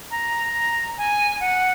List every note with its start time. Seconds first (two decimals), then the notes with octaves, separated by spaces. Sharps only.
0.11 A#5
0.98 G#5
1.40 F#5